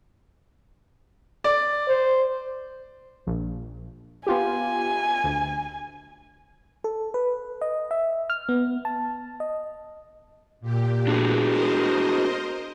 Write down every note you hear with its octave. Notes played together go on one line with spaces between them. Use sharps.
D5
C5
A#1
B3 F4 G4 G#5
D2
A4
B4
D#5
E5
F6
B3
A5
D#5
A#2 G4
D4 F#4 G#4
A#4 C5 D#5